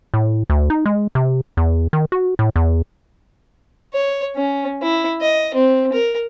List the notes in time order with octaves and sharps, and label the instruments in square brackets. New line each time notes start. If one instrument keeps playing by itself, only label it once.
[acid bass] A2
D2
D#4
G#3
C3
E2
D#3
F#4
A2
E2
[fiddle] C#5
C#4
E4
D#5
C4
A#4